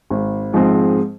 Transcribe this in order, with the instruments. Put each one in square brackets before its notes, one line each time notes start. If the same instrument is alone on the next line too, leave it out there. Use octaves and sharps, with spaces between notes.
[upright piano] G#1
G#2 F3 G#3 C4